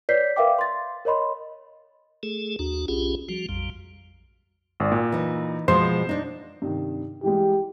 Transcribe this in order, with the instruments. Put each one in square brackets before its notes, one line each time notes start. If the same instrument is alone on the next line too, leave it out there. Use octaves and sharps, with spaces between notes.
[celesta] B4 C#5 D5 G6 B6 C7
A#4 B4 E5 F5 G5 D6
C6 A6
A#4 C#5 D#5 B5 C6
[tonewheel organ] A3 G#4 A4
D#2 D4 F#4
B1 C#4 F4 G4 G#4
F3 G3 F#4
A#1 F2 G3
[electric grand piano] G#1 D5
A#2
[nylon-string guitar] E3 D#4
[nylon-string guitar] B2 F3 G#3 [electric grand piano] C5 C6
[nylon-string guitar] D4 D#4
[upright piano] G2 C3 D#3
[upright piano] E3 G3 G#3 [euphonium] G4